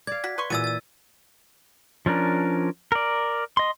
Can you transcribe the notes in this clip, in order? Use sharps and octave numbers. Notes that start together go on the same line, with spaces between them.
D5 F5 G#6
F#4 B6
B4 C6 C#6
A#2 E3 G#3 B3 F#4 E6 A6 D#7
E6 A6
F3 C#4 D4 A#4
A#4 D5
D#5 C6